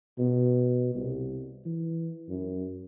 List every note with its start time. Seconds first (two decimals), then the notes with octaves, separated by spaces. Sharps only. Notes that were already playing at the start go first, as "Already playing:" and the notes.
0.18 B2
0.95 C2
1.65 E3
2.29 F#2